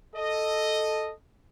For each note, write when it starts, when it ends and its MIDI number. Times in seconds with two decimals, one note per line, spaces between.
0.15 1.11 69
0.15 1.11 75